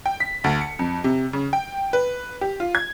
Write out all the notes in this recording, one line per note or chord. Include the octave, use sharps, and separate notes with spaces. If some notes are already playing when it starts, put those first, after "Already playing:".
G5
B6
D2
C#7
F2
C3
C#3
G5
B4
G4
F4
G#6